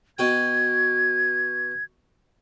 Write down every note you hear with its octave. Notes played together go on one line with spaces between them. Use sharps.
B2 F#4 G5 G#6